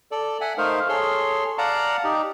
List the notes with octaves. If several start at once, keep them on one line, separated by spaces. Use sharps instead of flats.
A4 D5
E5 F#5 G#5
A3 D#4 A#4 C5 F5
G#4 A4 C#5 C6
D5 F5 F#5 A5 A#5
D#4 G4